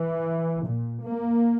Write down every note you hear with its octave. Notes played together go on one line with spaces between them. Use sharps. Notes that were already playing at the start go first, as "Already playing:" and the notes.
Already playing: E3
A#2
A#3